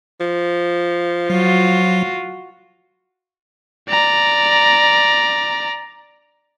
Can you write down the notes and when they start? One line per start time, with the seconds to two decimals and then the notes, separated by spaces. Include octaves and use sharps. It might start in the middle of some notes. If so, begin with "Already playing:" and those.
0.20 F3
1.30 F#3 F4 F#4
3.89 D5 A#5